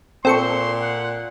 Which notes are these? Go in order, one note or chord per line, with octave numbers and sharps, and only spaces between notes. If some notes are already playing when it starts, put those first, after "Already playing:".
A#2 C4 A4 C6 C#6
F#5